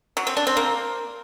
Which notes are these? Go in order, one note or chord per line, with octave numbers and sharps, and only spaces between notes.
F#3
C4
D4
C4
A#3